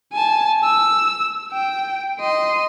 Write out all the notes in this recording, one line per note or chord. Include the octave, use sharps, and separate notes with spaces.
G#5 A5
E6
G5
D#5 C6